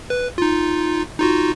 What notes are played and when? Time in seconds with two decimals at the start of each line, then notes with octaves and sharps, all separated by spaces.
0.10 B4
0.38 D#4 F4
1.19 D#4 F4 F#4